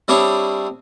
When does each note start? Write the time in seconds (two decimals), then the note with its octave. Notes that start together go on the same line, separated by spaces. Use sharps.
0.08 G3 C4 D4 E4 G#4 C#5